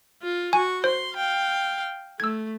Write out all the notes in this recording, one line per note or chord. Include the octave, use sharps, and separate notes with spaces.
F4
F#4 G#5 C#6
C5 C6
F5 G5
A3 E6 G#6